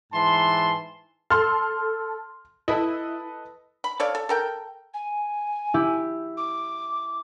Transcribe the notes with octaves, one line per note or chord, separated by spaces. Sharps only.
G#2 E3 A5 C6
A4 C6 F6
E4 A4 B4 D#5
B5
A4 C#5 D5 F5
A4
A4 A#4 G5
G#5
E4 G4
D6